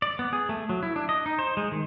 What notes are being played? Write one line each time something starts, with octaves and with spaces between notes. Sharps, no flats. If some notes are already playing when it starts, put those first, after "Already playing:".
D5
B3
G#4
A3
F#3
E4
D4
D#5
D#4
C5
G#3
D#3